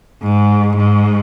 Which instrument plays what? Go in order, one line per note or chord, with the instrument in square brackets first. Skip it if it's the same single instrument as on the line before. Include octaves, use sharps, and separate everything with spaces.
[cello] G#2
G#2